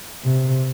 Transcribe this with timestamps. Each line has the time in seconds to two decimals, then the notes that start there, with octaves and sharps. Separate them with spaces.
0.24 C3